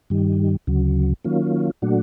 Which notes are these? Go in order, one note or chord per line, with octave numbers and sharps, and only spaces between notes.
G2 D#3 G3
D2 C#3 F#3
D#3 F#3 A#3 C#4 F4
A#2 F#3 A3 D4 F#4